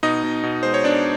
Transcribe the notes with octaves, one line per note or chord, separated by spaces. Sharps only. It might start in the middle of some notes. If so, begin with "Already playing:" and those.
B2 D#4 D#5
B2
B2
G#3 C5
C#5
B2 D4 D5